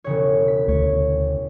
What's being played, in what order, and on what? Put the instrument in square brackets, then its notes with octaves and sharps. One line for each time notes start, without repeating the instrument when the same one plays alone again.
[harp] E1 C#3 C#5
B6
[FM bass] D2 [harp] C#5